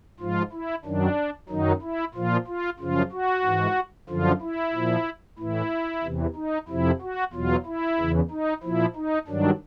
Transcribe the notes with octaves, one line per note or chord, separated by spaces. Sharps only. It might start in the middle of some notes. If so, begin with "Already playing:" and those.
G#2 F3 F4
E4
F#2 D#3 F#3 D4
F#2 D#3 F#3 D#4
E4
A#2 F3 F4
F4
F#2 C#3 F3 F4
F#4
G#2 E3
F#2 D3 F3 F4
E4
A#2 F3
A2 E3 E4
E2 C3 E3
D#4
F2 C3 F3 E4
F#4
E2 B2 F#3 F4
E4
E2 C#3 E3
D#4
A#2 F3 E4
D#4
G2 D#3 F#3 D4